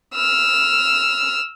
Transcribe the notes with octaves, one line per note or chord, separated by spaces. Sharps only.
E6 F6